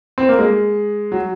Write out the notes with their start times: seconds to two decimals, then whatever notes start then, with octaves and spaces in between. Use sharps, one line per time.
0.18 C4
0.29 A#3
0.39 G#3
1.12 F#3